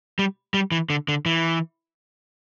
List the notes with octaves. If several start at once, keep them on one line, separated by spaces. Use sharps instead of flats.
G3
G3
E3
D3
D3
E3